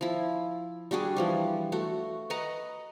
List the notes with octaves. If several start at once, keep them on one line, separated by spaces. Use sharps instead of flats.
F3 E4
G3 D4 F#4 G#4
E3 F3 G3
A3 F#4
B4 D#5 F#5 A#5